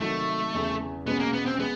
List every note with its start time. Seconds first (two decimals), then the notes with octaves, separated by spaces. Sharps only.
0.01 C3 D#3 F#3 A3
0.54 E2 C#3 E3
1.07 B2 G#3 B3 C#4
1.20 A#3
1.34 B3
1.47 C4
1.60 G#3 B3